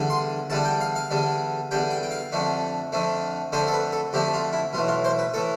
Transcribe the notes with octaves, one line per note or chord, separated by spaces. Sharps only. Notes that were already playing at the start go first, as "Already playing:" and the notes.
Already playing: E2 D3 G3 D4
C6
E2 D3 G3 D4 A5
G5
F5
F5
E2 D3 G3 D4
E2 D3 G3 D4 G5
G5
G5
F5
F2 D3 F3 A3 D4
F2 D3 F3 A3 D4
F2 D3 F3 A3 D4 C5
A4
B4
A4
F2 D3 F3 A3 D4 G4
F4
E4
B1 A2 E3 F4
F4
C5
B4
A2 E3 A4